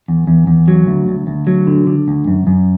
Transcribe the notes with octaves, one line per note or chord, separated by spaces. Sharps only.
E2
E2
E2
F#3
D2
D2
D2
F#3
D3
D3
D2
F#2
F#2